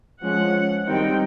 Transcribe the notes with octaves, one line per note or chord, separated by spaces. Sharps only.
F3 G#3 C#4 F#5
D#3 G3 C4 D#4 G5